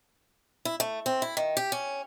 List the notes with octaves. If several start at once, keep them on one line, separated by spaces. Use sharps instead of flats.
E4
A3
C4
E4
D#3
G4
C#4